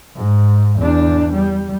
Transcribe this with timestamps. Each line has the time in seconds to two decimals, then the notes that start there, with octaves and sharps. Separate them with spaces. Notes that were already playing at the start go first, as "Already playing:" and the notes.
0.16 G#2
0.79 E2 D4
1.33 G3